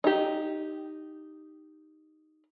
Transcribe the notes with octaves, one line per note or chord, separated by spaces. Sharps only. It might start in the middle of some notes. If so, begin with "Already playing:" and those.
D#4 G4